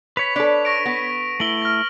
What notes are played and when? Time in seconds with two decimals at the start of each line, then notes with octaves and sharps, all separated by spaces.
0.17 B4 C#5 B5 B6 F7
0.36 D4 A4
0.65 C#6 A#6 D7
0.85 B3 A#6
1.40 A3 E4 F#7 G7
1.62 F6 A#6